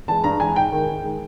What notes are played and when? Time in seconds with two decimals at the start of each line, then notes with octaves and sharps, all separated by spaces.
0.08 E3 G#3 A5
0.24 G2 A#5
0.40 E3 G#3 G#5
0.56 G#2 G5
0.72 D#3 G#3
0.88 G#2
1.04 D#3 G#3